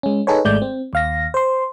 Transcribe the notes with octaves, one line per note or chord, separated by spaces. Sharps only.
G#3 C#4
D#4 G#4 A4 B4 C#5
G#1 G#3 A3 D5 G6
C4
D#2 F5 A#6
C5 C6